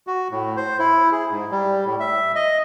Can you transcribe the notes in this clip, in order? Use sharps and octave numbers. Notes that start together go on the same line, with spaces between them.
F#4
A2
C5
E4
G#4
G#2
G3
A2
E5
D#5